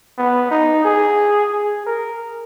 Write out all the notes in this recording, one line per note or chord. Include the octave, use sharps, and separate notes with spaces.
B3
D#4
G#4
G#4
A#4